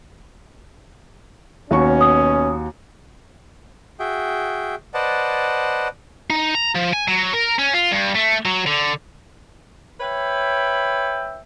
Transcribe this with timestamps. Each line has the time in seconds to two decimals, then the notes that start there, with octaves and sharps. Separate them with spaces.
1.71 D#2 B2 C#4 F#4 C#6
2.01 D#6
4.00 F#4 G#4 E5 G5
4.94 B4 C5 D5 D#5 F#5 A5
6.30 D#4
6.55 A#5
6.75 F3
6.93 G#5
7.08 F#3
7.33 A#4
7.59 C#4
7.74 F4
7.92 G2
8.15 A3
8.46 F#3
8.66 D3
10.00 B4 C#5 E5 G5